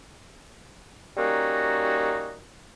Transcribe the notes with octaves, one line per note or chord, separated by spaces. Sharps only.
G3 A#3 C#4 D#4 F#4